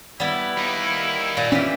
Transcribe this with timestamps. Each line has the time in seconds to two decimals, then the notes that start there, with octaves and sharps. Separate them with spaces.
0.20 G3 B3 E4
0.58 A#3 D#4
1.37 A#2
1.52 E3 C#4 G4